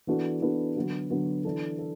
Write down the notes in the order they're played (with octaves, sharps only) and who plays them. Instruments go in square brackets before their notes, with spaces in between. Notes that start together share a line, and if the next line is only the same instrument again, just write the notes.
[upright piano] E3 B3 D4 F#4 A4
E3 B3 D4 F#4 A4
D3 F#3 B3 F#4
D3 F#3 B3 F#4
E3 D4 A4
A4